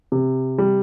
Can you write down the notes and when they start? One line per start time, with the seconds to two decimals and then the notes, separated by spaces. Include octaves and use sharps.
0.12 C3
0.58 G3